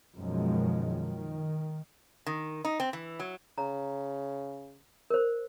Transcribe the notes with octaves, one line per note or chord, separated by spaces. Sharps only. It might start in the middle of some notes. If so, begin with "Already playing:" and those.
F#2 B2 D#3 F3 G#3
D#3
D#3
D#4
C4
E3
F#3
C#3 A#5
A#4 C5